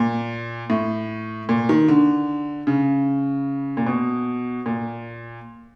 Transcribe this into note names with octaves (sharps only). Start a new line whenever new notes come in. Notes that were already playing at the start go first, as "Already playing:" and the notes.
Already playing: A#2
A2
A#2
D#3
D3
C#3
A#2
B2
A#2